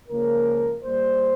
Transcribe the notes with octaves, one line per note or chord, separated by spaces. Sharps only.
C#2 C#3 F3 A#3 A#4
A#2 G3 A#3 C5